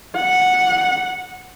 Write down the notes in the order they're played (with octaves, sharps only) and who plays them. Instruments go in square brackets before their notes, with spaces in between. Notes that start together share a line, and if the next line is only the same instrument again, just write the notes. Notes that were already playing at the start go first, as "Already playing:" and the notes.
[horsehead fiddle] F#5